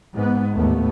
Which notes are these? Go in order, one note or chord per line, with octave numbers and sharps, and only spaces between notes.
G#2 B3
A1 D#2 A3 B3